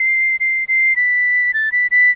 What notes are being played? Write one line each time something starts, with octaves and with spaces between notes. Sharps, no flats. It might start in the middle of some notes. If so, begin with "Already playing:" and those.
Already playing: C7
C7
C7
B6
A6
B6
B6